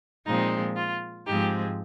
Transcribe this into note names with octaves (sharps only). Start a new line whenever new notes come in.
A#2 F3 G#3 C4 D#4
F4
G#2 F3 G#3 C4 D#4 G4